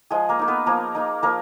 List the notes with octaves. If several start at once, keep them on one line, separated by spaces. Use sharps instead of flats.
F3 G#3 G#4
A#3 A#4
A#3 D#4
B3 B4
F3 A#3 A#4
A#3 D#4
F3 A#3 A#4